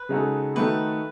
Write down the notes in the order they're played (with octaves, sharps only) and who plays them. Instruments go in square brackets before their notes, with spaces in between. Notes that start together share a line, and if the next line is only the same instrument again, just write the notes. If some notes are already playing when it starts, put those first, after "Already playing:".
Already playing: [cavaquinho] B4
[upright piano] C#3 G#3 D#4 F#4 A4
[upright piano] D#3 A3 D#4 F#4 A4 [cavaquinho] B4